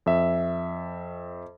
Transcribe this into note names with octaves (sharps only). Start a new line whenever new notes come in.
F2 E5